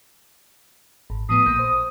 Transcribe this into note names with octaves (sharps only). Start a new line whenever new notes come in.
G#1
A2 F3 B3 D#6
A#1 A#3 G6
C5